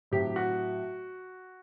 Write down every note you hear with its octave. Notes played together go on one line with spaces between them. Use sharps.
A2 F#3 C4 G4
F#4